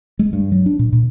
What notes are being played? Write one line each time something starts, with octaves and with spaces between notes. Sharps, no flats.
G#3
G2
F#3
D4
A#2
A#2